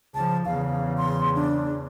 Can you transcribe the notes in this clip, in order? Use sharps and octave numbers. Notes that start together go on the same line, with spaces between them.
C#2 F3 A5
E2 C#3 F5
C6
D4